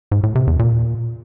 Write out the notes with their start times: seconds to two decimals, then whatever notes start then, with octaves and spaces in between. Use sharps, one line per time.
0.11 G#2
0.23 A2
0.35 C3
0.47 E2
0.59 A#2